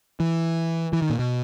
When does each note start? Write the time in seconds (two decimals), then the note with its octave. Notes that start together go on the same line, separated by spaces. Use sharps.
0.20 E3
0.93 E3
1.02 D#3
1.10 A#2
1.19 B2